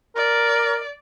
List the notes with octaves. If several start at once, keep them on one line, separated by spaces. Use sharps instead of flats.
A#4 D5